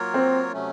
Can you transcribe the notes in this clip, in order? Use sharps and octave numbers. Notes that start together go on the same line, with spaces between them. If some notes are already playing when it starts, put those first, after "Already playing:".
Already playing: F#3 A#3 F4 A#4 C#5
C4
C3 F#3 A3 C#4